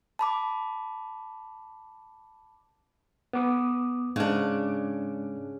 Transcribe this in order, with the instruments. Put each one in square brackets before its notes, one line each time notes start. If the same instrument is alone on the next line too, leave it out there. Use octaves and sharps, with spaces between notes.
[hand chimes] A5 B5 D6
[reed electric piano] B3 D6 D#6
[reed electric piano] G#2 G#3 [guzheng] C#3 D4